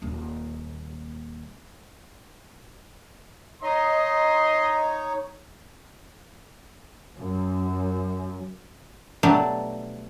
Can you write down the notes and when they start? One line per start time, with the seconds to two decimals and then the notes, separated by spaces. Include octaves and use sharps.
0.02 D#1 D#2
3.63 D#4 C#5 D#5 C6
7.16 F#2
9.23 B2 F#3 G3 A3 D4